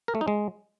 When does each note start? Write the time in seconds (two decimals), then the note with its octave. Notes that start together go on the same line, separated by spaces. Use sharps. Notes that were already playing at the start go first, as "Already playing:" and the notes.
0.08 A#4
0.15 A3
0.21 D#4
0.28 G#3